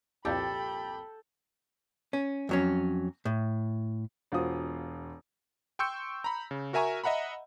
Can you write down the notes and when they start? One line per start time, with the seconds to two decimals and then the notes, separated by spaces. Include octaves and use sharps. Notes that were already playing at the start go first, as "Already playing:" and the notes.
0.25 C2 F2 A#2 G4 A4 G5 B5 G6
2.13 C#4
2.49 F2 F#3 C#4
3.25 A2
4.32 E1 F4 F#4 C5 D#6
5.79 G5 C6 C#6 E6 G6 C#7
6.24 A#5 B5
6.51 C#3
6.73 F#4 A#4 E5 G#5 A#5 C#6
7.04 D#5 E5 F#5 A#5 B5